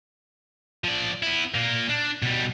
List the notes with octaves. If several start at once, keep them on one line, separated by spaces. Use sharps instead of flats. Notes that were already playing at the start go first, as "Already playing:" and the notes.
F3 D5
B3 E4
A#2 A#3
D4
B2 G3